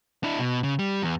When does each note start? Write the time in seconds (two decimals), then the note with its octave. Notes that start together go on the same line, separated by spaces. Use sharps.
0.24 D4 E4
0.39 B2
0.64 C#3
0.79 G3
1.02 E2